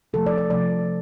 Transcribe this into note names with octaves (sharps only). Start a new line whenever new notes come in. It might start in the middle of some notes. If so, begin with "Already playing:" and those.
C3 F3 A3 A4
D5
D5
C3 F3 A3 D5